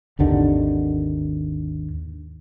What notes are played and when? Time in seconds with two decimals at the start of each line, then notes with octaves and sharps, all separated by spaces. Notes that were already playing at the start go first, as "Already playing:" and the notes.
0.19 G#1 D#2 D3 D#3